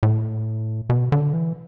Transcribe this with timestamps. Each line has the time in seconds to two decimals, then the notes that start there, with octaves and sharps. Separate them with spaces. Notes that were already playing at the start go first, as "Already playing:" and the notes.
0.03 A2
0.90 B2
1.12 D3
1.33 E3